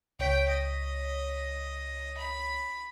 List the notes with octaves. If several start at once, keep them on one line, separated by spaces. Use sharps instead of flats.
C#2 C#5 G5 B6
D#5
B5